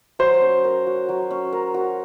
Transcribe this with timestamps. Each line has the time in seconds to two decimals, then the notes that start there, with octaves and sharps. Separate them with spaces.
0.19 F#3 C5
0.41 C#4
0.64 A#4
0.87 F#4
1.09 F#3
1.31 C#4
1.53 A#4
1.74 F#4